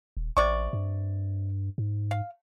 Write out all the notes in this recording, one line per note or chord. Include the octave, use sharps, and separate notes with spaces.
D#1
A1 C3 D5 C#6
G2
G#2
F5